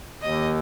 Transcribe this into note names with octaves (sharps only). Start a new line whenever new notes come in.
D#2 D#5